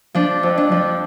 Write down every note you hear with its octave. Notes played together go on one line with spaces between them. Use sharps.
F3 D4
F2
D4
F3